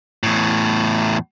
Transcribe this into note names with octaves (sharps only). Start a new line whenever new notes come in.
E2 A2